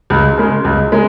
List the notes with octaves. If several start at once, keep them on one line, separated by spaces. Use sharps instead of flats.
C#2
C#3 G#3
C#2
G#3